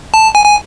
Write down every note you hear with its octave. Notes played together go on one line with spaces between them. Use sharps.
A5
G#5
G#5